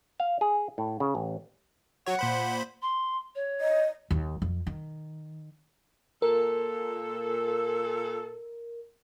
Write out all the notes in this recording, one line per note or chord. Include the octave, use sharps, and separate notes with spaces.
F5
G#4
A2
C#3
A1
F#3 C#5 F#5
A#2 C5 B5
C6
C#5
D#5
D#2
F2
D#3
A#2 A4 A#4